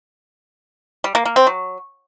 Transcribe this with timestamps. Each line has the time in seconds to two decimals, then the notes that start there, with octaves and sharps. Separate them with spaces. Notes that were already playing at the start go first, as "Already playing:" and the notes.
1.04 G3
1.15 A#3
1.25 A#3
1.36 C4
1.47 F#3